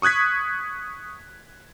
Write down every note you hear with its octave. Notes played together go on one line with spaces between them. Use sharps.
C#6 D#6 F#6 G#6 B6